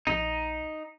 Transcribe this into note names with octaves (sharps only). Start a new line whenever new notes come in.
A#1 D#4